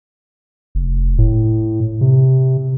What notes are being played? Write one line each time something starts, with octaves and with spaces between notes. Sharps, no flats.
F1
A2
C3